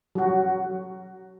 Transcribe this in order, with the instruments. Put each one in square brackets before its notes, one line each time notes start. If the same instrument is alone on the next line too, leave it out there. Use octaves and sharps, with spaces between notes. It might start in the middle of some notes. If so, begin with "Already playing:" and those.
[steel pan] F#3 F#4